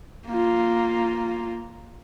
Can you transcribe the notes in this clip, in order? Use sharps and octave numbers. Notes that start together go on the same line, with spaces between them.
A#3 F4